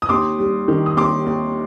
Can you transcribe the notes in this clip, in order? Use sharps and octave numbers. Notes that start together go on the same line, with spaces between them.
D#6
D#2 C6 D6
G3
D#3
D#6
D#2 C6 D6
D#2